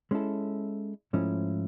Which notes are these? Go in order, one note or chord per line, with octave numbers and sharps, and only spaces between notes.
G#3 C#4 E4 A4
G#2 F3 A3 C#4 E4